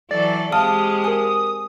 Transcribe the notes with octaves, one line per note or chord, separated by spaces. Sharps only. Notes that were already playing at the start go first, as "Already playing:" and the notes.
E3 F#3 A4 D5
G#3 C4 G4 F5 A5 D#6 F6
A#4 G#5